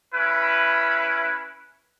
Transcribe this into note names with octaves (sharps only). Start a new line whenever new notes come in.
C#4 E4 B4